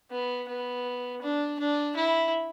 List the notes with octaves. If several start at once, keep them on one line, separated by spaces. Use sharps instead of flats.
B3
B3
D4
D4
E4